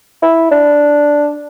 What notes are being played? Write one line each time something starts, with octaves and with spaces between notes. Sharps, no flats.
E4
D4